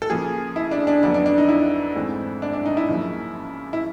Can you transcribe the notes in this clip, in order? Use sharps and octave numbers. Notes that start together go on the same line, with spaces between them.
A4
C#3 F3 A#3 G#4
E4
D4
D4
F2 D3 F#3 B3 D4
D4
D4
D#4
E4
G#2 E3 A3 C4
D4
D4
D#4
E4
F#2 C#3 F3 A#3
E4